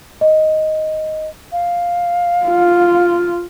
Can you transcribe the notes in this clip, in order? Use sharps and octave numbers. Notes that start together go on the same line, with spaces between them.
D#5
F5
F4